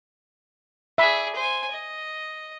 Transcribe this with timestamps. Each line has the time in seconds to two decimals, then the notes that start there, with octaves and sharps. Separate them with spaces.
0.98 G#4 D5 E5 B5
1.35 C5 G#5
1.71 D#5